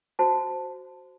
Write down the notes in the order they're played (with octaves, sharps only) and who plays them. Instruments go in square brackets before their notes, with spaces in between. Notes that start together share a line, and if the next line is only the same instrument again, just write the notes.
[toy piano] F#4 C5 A5